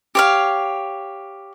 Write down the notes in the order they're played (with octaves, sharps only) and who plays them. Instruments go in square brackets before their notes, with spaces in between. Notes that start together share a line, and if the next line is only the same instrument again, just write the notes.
[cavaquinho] G4 C#5 F5